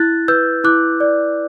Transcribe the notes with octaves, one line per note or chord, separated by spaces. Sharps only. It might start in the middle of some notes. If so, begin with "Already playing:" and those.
Already playing: E4 F#6 A6
B4 E6 G6
E4 D6 F#6
D5